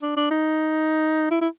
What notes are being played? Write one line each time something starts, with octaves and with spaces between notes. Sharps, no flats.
D4
D4
D#4
E4
E4